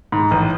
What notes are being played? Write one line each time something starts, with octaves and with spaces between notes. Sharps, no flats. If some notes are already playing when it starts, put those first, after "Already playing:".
G#2
A1